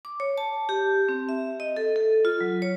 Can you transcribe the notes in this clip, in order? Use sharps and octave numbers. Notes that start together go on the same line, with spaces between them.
D6
C#5
A5
G4
C4
E5
D#5
A4
A4
F4
F#3
C#5